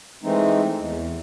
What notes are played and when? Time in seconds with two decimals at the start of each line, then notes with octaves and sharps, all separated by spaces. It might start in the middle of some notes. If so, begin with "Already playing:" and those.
0.23 E3 G#3 A3 C4 D#4
0.79 E2